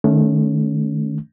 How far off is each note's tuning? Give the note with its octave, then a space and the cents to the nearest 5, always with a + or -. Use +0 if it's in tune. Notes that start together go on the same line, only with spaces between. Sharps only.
D#3 -30 A3 -20 C#4 +0